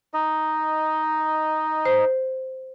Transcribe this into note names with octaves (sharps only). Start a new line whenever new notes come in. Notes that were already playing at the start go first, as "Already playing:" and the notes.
D#4 D#5
C5